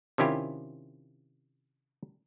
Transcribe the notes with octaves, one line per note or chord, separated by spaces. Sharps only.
C3 D#3 C#4 E4 F4 G4